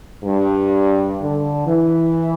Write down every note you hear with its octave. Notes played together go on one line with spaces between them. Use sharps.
G2
D3
E3